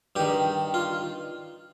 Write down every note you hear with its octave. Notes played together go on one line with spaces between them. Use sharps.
G2 D#3 G4
F4